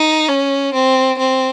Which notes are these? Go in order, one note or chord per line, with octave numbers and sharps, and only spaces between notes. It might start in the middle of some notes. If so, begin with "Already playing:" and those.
Already playing: D#4
C#4
C4
C4